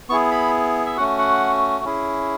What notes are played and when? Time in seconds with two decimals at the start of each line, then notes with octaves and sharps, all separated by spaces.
0.09 B3 E4 G#4 C#6
0.31 B5
0.86 E5
0.97 A3 C#4 F#4 F#5
1.19 F#5
1.85 C#4 E4 G#4